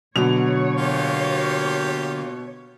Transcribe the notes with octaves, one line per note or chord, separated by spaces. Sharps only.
B2 D3 F#3 C#5 F7
A#3 F4 G4